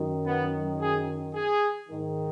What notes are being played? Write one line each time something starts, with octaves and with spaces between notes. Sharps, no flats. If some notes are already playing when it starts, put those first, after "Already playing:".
Already playing: F#2 D#3
B3
G#4
G#4
G#2 D#3